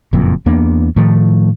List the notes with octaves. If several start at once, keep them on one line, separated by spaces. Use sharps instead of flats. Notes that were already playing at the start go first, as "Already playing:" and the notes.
F#1 F2 A#2
E2 A#3 B3 D4
A2 D#3 F3 A3